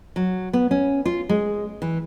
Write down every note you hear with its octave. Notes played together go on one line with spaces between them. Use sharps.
F#3
B3
C#4
F4
G#3
E3